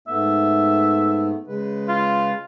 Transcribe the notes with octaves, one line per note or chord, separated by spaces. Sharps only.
G#2 A3 B3 E5
C#3 G#3 B4
F4